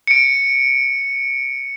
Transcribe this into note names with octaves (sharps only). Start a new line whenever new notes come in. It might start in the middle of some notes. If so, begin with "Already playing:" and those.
C#7 D7